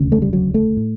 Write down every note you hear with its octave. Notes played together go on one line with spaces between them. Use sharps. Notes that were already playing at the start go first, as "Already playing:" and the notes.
Already playing: E1 D2 C#3
A3
G3
F#3
A3
A2